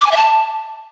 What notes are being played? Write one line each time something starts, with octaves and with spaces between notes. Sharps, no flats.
D6
G#5
E5
A5